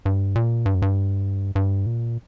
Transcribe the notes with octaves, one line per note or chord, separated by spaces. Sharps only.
G2
A#2
G2
F#2
G2
G2
A#2